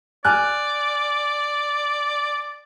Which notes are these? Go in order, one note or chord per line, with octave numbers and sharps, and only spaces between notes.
D5 G#5 F6 F#6